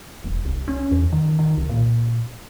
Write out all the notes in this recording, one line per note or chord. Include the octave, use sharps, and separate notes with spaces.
E1
C2
C#4
E2
D#3
D#3
C2
A#2